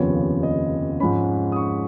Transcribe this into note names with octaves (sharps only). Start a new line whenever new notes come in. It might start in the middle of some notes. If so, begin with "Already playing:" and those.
Already playing: F1 D#2 C#3 F3 B3 C#5
D#5
G#2 F3 G#3 C#4 B5
D#6
C#6